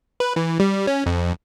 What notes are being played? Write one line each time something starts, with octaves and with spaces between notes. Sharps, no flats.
B4
E3
G3
C#4
F2